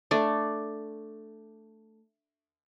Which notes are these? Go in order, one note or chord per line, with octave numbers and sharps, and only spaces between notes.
A3 D4 A4 D5